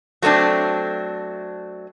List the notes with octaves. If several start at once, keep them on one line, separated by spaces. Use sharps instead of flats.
F#3 A3 C4 D4